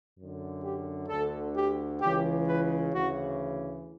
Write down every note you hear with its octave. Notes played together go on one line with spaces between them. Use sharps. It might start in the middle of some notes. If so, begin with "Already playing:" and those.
F#2 D3
G4
D2 D3 A4
G4
C#2 C#3 E3 G4
B4
D2 C#3 E3 F#4